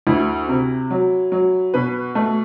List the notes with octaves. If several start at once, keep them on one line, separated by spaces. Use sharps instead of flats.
D2 E4
C3
F#3
F#3
B2 B4
A3